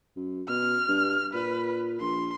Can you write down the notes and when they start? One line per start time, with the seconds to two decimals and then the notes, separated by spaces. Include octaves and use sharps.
0.16 F#2
0.49 B2 F6
0.88 G2
1.34 A#2 B4
2.00 A#1 C6